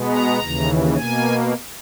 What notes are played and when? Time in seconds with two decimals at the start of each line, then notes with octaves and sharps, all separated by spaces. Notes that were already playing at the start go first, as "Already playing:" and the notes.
Already playing: B2 G#3 B3
0.10 A#5
0.40 D#2 C#3 E3
0.96 B2 A#3 G#5